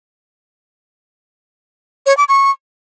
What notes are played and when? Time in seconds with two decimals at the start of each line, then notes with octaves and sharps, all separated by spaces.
2.06 C#5
2.17 D6
2.29 C#6